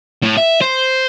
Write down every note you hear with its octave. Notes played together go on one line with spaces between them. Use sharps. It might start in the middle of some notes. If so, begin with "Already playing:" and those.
A2
E5
C5